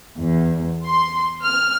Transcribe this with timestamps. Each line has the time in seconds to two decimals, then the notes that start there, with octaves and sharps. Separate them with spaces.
0.19 E2
0.86 C6
1.43 F6